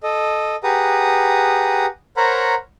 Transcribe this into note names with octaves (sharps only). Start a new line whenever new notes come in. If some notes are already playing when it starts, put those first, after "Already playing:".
A4 D#5
G4 G#4 B4 F#5 A#5 D#6
A#4 C5 C#5 F#5 A#5 B5